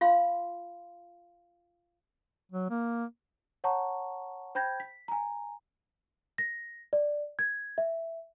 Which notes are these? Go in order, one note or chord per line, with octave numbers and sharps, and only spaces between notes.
F4 F5 C6
F#3
A#3
C#5 F#5 A5 A#5 C#6
C5 G5 B5 G6 G#6 A#6
B6
G#5 A#5
A#6
D5
G#6
E5